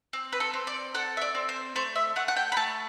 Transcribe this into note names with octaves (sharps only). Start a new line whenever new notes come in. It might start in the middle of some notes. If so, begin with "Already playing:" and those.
C4
B4
A4
C4
D5
A4 F#5
E5
D5
C4
C5
A3 C5
E5
A3 F#5
F#5
G5
B5
A3 A5